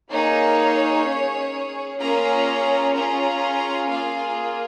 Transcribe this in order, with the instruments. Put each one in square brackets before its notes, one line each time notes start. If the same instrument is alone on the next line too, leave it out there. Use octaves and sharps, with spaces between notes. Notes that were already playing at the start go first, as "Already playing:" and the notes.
[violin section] A#3 D#4 G#4 C#5
C#4 G#4
A#3 C#4 F4 G#4 A#5
C#4 F4 G#4 A#5
A#3 F4 G#4 F5